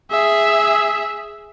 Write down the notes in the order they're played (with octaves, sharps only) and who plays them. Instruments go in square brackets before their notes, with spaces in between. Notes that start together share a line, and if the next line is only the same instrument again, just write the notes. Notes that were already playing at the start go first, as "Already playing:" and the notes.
[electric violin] G#4 E5